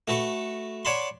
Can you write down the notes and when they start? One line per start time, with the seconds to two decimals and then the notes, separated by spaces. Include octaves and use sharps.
0.08 A3 F#4 A4 B4
0.85 C#5 D5 F#5 A5 B5 C6